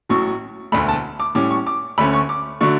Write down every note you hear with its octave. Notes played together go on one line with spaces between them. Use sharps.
A1 A2 F#3 C#6
E1 D2 D3 A3 B5
A5
D6
A2 G3 C#4 D6
C#6
D6
D2 D3 A3 C#4 B5
C#6
D6
D3 F#3 A3 D4 C#6